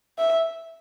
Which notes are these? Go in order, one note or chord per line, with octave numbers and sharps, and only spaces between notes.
E5